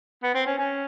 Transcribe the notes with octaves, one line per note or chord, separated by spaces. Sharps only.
B3
C4
C#4
C#4